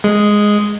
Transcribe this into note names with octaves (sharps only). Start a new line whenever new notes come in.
G#3